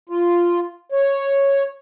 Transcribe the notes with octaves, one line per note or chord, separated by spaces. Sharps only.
F4
C#5